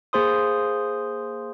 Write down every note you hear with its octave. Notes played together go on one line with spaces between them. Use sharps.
A#3 G#4 C5 C6 D#6